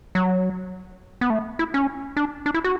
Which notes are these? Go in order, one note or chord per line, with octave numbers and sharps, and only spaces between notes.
F#3
B3
A3
E4
C#4
D4
D4
E4
F#4